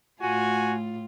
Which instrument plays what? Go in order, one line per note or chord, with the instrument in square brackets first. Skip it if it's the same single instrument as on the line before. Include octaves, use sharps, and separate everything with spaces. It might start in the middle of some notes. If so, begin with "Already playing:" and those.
[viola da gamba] A2 F4 [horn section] F#4 G#5